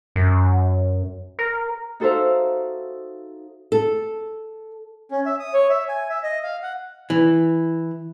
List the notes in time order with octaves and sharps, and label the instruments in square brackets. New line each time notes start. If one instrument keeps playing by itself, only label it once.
[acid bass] F#2
A#4
[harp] D#4 F#4 A4 C5 E5 F5
[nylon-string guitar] A4
[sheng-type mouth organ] C#4
E5
D#6
C#5
E5
G#5
E5
D#5
F5
F#5
[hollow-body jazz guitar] E3